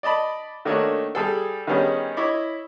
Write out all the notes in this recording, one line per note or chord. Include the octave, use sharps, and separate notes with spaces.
D5 D#5 A5 B5
D#3 A3 A#3 D4 F#4 C#5
G3 G#4 A4
D#3 G3 B3 C#4 G#4 C#5
E4 C#5 D#5 B5 C#6 D6